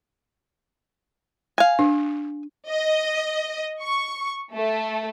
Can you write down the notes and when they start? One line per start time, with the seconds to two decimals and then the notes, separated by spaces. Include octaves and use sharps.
1.58 F5 G#5
1.79 D4
2.69 D#5
3.81 C#6
4.54 A3